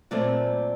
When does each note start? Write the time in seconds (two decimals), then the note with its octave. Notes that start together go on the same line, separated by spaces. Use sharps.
0.11 A#2 F#3 A3 C4 D5